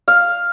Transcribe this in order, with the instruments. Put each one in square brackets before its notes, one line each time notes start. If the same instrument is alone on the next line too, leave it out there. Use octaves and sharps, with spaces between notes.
[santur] F5